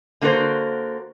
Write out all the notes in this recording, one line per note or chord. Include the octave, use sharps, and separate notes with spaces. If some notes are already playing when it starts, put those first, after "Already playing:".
D3 A#3 F#4 A#4 C5